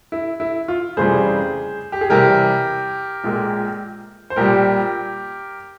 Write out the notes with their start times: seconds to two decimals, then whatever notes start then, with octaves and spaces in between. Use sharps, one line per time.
0.12 E4
0.40 E4
0.68 F4
0.97 F1 E2 C#3 G3 G#4 C5
1.92 G4
2.01 G#4
2.10 E2 C3 G3 G4 A#4
3.24 A#1 A#2 G#3
4.30 C5
4.36 A#1 A#2 G3 G4 A#4